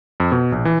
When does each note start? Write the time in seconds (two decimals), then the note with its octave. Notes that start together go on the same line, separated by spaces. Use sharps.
0.20 F2
0.32 B2
0.52 A#1
0.65 E3